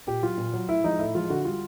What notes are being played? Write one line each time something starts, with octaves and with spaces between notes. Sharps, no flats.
A#2 G4
F#3 F4
A#2
F#3
A2 E4
F3 G#3 D#4
A2 E4
F3 G#3 F4
D3 F#4
G3 F4